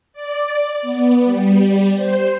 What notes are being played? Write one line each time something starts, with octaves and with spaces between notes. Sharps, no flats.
D5
B3
G3
C5